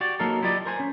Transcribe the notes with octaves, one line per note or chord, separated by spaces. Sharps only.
F#4 G4 D5
F#3 A#3 D#4 A4 A#4
E4 F4 G4 D5 D#5
A#4 C5 G#5
C#4